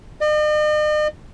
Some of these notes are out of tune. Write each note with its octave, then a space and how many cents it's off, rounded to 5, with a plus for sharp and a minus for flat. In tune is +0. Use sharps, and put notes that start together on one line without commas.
D#5 -45